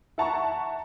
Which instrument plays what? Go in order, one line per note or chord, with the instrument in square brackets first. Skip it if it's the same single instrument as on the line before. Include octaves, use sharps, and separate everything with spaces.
[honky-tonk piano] E4 F#5 A5 A#5 C#6